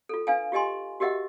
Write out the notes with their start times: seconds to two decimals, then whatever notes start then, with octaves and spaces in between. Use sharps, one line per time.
0.09 F4 A4
0.27 D4 B4 F5 G#5
0.52 F4 G4 D#5 G#5 C6
1.00 F#4 G4 A#4 D#5 E5 F#5